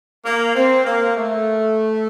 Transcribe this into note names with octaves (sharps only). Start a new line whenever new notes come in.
A#3
C4
A#3
A3